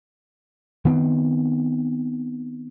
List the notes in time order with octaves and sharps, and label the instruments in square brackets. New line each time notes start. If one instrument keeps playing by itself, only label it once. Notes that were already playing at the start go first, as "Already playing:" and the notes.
[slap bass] D#3 B3 C4